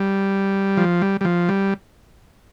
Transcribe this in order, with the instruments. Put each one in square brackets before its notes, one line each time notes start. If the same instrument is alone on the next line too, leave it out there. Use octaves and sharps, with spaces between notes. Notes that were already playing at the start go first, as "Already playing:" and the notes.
Already playing: [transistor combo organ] G3
F3
G3
G3
F3
G3